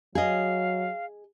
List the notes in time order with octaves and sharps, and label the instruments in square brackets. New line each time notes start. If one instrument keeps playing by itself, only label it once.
[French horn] F#3 [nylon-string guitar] G#4 D#5 [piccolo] F5